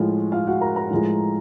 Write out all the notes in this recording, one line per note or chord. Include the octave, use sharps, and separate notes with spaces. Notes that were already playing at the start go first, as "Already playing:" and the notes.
Already playing: A2 F3 G#3 F4
F4 F5
F#4 F#5
A#4 A#5
A#4 A#5
A2 F3 G#3